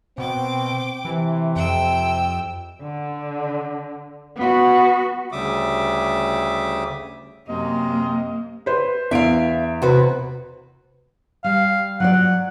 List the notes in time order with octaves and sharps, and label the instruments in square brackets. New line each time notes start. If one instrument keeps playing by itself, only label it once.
[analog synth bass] B2 [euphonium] C4 [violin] G5 D6
[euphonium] C3 [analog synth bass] E3
[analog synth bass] F2 [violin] G5 E6
[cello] D3
B3 F#4
[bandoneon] D2 C#3 G3 E5 D6 D#6
[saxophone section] F#2 C3 D#5 [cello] A#3
[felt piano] B4 C5
[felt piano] E2 D7 [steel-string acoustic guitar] E5 F5
[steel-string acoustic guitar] C3 F#4 B4
[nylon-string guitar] G3 [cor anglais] F5
[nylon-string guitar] F#3 F4 D5 [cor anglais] F#5